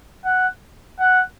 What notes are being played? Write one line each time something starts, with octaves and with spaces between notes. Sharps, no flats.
F#5
F#5